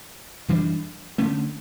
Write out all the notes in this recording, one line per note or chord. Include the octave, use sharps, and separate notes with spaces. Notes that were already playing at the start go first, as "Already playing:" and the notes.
F#2 E3 G3 D4
D3 A3 C#4